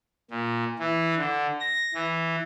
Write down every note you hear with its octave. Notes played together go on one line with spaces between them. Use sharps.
A#2
E3
D3
A#6
E3